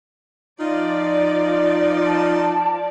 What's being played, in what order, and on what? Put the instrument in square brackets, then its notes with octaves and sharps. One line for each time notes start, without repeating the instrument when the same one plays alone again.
[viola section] F3 D5 [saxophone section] D#4 F4
[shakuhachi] A5